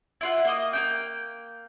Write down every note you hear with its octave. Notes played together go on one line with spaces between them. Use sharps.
E4 F4 F#5
A#3 D#5 D#6
A#3 C#4 G5